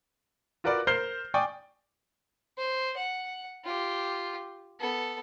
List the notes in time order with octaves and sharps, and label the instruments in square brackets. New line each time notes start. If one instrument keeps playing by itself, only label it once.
[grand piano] F4 F#4 A#4 B4 D5 F#5
A#4 C5 F6 G6 C7 G7
D5 G5 G#5 C#6 D#6
[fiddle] C5
F#5
F4 G4
B3 A4